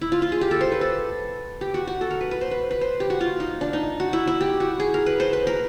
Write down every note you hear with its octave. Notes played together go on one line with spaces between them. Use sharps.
E4
F4
F4
G#4
G4
A4
C5
B4
A4
G4
F#4
F#4
A4
A#4
B4
B4
C5
B4
B4
C5
G4
F#4
F4
D#4
D4
D#4
F#4
E4
E4
G4
F#4
G#4
A#4
B4
C5
B4
A#4